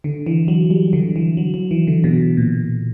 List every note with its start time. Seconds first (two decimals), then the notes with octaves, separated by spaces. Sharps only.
0.04 D3
0.26 E3
0.48 F#3
0.70 G3
0.93 D3
1.16 E3
1.37 F#3
1.54 F#3
1.71 E3
1.87 D3
2.04 B2
2.37 A#2